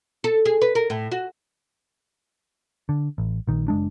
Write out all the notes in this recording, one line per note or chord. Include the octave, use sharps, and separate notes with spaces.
A4
G#4
B4
A#4
A2
F#4
D3
A1
A#1 D#3
F#1 G#3 D4